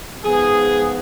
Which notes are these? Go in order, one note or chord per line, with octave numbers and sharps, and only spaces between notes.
G#2 F3 B3 G#4